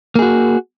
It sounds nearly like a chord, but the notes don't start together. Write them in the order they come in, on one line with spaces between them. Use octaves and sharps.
A#3 G#4 F#4